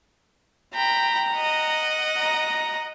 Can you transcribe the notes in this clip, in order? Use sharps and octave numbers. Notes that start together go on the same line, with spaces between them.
G5 A#5 B5
D#5 F#5
A#5